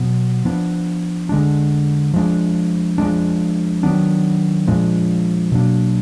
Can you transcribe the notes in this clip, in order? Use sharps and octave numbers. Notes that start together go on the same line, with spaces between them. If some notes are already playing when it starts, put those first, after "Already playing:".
Already playing: B2 F#3 B3
F3 B3 D4
D3 G#3 D4
F3 G#3 D4
F3 G#3 D4
D#3 F#3 B3 D4
A#2 F3 G#3 D4
B2 F#3 A#3 D4